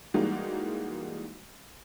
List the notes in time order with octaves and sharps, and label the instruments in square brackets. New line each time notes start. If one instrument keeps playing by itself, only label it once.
[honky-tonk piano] E3 G3 G#3 A#3 D#4 F#4